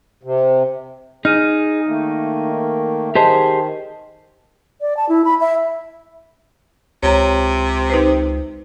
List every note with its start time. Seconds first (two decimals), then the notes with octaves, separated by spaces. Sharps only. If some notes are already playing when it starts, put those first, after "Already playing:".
0.23 C3
1.25 D#4 G#4 F6 D#7
1.88 D#3 A3 A#3
3.15 D#3 G4 G#4 C5 D#5 A5
4.81 D5
4.97 A5
5.09 E4
5.25 B5
5.41 E5
7.03 C#2 C3 C#5 A#5
7.90 D#4 B4 C5